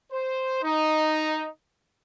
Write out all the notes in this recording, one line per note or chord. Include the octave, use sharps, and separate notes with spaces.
C5
D#4